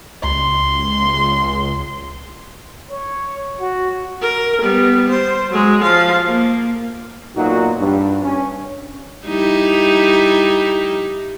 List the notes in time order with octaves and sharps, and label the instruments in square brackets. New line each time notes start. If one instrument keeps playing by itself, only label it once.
[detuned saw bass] C#2 [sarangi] C6
[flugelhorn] C#5
F#4
[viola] A#4
G3 B3
C5
F#3 G#3
F3 F5
A#3
[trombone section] B1 A#2 F#3 D#4 F#4
G2
C#4
[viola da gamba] G3 D#4 E4